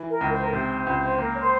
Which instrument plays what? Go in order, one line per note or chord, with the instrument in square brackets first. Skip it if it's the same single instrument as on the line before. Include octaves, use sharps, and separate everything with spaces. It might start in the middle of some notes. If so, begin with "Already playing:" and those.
Already playing: [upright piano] E3
[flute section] A#4
[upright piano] C#2
[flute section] C5
A#4
[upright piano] C3 [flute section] C5
[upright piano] C#2
[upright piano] A#3 [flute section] A#4
[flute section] C#5
C5